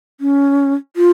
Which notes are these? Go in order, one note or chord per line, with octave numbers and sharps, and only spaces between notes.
C#4
F4